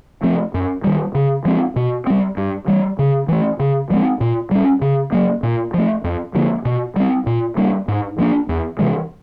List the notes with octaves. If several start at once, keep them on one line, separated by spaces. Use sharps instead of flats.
F3 A3 C4
F#2
D#3 G3
C#3
F3 G#3 C4
B2
G3 C4
G2
E3 G3
C#3
E3 A3
C#3
F3 G#3 C4
A#2
G3 A#3 C#4
C#3
F#3 A#3
A#2
F3 A3
F2
D3 F3 A#3
B2
G3 C4
A#2
G3 A#3 D4
G#2
F3 A#3 D4
E2
C3 E3 G#3